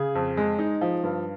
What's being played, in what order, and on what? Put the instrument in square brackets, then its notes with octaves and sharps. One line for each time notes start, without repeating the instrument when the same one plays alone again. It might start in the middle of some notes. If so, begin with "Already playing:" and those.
Already playing: [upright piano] C#3 [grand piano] G#4
[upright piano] F2
G#3
D#4
F3
G2